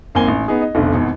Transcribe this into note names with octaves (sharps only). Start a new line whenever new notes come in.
G#1 A#3 C4 G#5 G7
A1
B3 D#4 G#4
D#5
F1 B1 D3
G#1 E2 B2